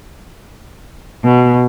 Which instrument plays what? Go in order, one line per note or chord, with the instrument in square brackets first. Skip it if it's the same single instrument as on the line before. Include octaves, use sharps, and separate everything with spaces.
[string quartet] B2